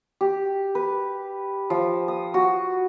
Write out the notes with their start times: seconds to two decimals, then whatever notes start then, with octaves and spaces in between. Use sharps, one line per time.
0.21 G4
0.75 B4
1.70 F3
2.08 D#6
2.34 F#4